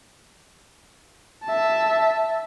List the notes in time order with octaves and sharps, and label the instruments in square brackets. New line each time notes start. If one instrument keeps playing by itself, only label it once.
[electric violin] E5 A5